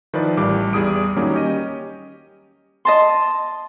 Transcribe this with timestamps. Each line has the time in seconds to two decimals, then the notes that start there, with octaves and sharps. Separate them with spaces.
0.14 D#3 F3 E4 B4 D5
0.37 A1 G3 D6
0.73 E2 G3 G#4 D#6 D7
1.16 D#3 F#3 G3 A#3 C#4 D#4
1.33 C#4 G4 D#5 D#7
2.85 D#5 A5 C6